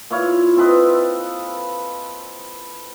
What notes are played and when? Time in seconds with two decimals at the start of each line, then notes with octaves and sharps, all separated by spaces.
0.10 A#2 E4 C#5 F5
0.57 C4 A4 B4 D#5